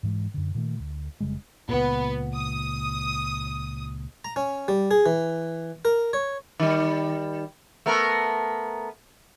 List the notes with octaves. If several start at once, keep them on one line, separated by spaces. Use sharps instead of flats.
G#2 E3 G3 G#3
F#2 D3
A#2 D#3 A3
D2
F1 C#3 G3 G#3
C#2 A#2 B3
D#6
A#5
C#4
G3
G#4
E3
A#4
C#5
D#3 G3
A3 B3 A#4